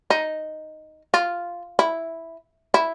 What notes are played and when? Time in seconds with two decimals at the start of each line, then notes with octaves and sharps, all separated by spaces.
0.10 D#4
1.14 F4
1.79 E4
2.74 E4